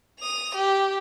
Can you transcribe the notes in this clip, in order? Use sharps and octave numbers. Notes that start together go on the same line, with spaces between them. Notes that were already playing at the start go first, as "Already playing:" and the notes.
D#6 F7
G4